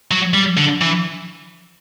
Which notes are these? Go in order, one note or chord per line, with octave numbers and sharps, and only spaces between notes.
F#3
G3
D3
E3